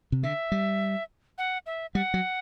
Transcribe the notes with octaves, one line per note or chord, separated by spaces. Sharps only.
C3
D3 E5
G3
F#5
E5
G3 F#5
F#3